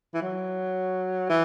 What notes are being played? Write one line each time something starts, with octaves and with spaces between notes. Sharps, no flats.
E3
F#3
E3